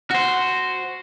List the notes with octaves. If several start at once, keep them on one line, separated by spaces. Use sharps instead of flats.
F#4 C5